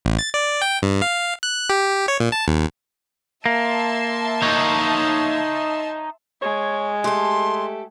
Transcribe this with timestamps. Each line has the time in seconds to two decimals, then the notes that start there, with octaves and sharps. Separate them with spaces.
0.05 A1
0.19 A6
0.34 D5
0.62 G5
0.82 G2
1.02 F5
1.43 F#6
1.70 G4
2.08 C#5
2.20 A#2
2.32 A5
2.48 D#2
3.46 A#3 E5 A5 C6
4.43 D#4 C#5
6.42 G#3 C#5
7.04 A3 G4 A4 C6